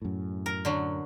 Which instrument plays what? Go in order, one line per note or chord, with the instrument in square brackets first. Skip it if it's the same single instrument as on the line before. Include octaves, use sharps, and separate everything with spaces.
[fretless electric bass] F#2 A2
[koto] A#4
D3 F#3